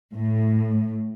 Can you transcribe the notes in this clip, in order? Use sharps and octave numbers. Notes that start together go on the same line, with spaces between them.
A2